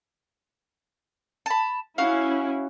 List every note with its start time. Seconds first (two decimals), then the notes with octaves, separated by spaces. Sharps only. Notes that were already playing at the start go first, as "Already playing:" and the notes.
1.46 A5 B5
1.98 C#4 E4 F#4 F5